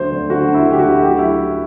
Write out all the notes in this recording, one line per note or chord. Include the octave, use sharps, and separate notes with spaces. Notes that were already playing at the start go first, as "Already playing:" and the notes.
Already playing: D2 D3 F#3 C5 D5
D2
D3 F#4
D2
E4
D3
G4
F#4
D2
F#3 G4
F#4
E4
F#3 F#4
F#3